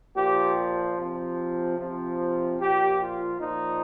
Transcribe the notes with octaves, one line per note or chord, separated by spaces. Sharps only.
A#2 F3 G4
C3 F3
C3 F3
A#2 F3 G4
F4
A#2 F3 D#4